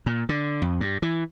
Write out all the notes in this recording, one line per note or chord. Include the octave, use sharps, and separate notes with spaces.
A#2
D3
F2
G2
E3